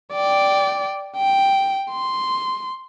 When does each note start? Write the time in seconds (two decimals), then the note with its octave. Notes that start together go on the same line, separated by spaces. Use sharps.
0.13 D5 G5
1.17 G5
1.92 C6